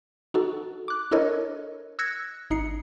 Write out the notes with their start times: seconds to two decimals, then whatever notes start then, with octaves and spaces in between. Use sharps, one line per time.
0.34 D#4 F#4 A4
0.88 D6 F#6
1.11 D4 E4 A4 A#4 C#5 D#5
1.99 E6 F#6 G#6 A#6 C#7
2.50 G#1 D#4 C7 C#7